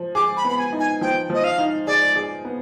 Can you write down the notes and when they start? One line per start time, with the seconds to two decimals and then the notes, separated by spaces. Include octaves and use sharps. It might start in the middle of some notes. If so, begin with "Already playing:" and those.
Already playing: F3
0.15 G#4 D6
0.37 B5
0.44 B3
0.50 B5
0.58 G#5
0.73 D#4
0.80 G#5
1.01 F3 G5
1.30 F3 D#5
1.44 F5
1.58 D#4
1.87 G#4 D5
2.16 G#4
2.45 B3